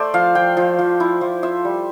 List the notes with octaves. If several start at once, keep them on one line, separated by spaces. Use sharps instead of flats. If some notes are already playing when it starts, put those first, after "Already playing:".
Already playing: A3 C5 D5
F3 F5
F3 G5
F3
F3
E4
F3
F4 E5
G3